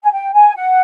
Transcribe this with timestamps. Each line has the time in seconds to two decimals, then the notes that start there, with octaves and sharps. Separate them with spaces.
0.04 G#5
0.12 G5
0.34 G#5
0.55 F#5